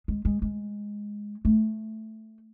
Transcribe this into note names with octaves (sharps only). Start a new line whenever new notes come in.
G#3
G#3
G#3
A3